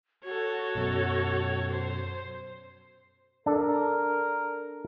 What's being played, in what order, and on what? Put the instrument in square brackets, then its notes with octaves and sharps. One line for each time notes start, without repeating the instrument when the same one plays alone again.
[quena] F#4 [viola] A4 C#5
[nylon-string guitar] F#2 B2
[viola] C5
[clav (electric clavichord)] D4 A4 [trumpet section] A#4